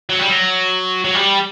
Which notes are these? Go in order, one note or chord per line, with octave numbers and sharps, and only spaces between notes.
F#3
G3
F#3
F#3
G3